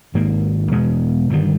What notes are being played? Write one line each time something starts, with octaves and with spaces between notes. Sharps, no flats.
G#1 G#2 D#3 A#3
E2 B2 G#3 B3
G1 G2 D#3 G3